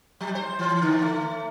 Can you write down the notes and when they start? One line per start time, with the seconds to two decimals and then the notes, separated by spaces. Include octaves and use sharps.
0.21 F#3
0.35 C5
0.59 E3
0.82 D3
1.02 A3